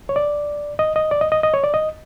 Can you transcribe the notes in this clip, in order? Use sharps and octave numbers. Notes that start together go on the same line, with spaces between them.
C#5
D5
D#5
D#5
D5
D#5
D#5
D#5
C#5
D5
D#5